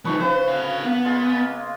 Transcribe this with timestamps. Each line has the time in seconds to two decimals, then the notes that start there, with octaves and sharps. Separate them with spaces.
0.05 F3 D#4 B4 C#6
0.21 C#3 B4 C5
0.48 D3 F5
0.84 A#3 B3
1.05 G#3 F4